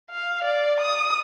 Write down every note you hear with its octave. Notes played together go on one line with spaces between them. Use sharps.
F5
D5
D#6